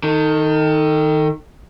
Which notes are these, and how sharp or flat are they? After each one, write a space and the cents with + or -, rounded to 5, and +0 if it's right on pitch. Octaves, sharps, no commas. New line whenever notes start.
D#3 +5 A4 +35